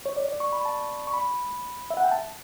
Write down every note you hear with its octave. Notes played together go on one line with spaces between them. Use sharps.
C#5
D5
D5
C#6
B5
A5
C#6
B5
E5
F#5
G5
A5